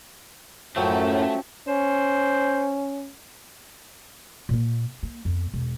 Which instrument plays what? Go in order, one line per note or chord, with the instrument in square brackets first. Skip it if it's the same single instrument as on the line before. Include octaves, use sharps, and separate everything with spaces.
[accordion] F#2 A2 [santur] F3 F#3 G5 [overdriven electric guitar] A3 [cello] C#4
[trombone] C#4 [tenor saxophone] C5
[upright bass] A#2 A#3
A#3
F2 B3
E1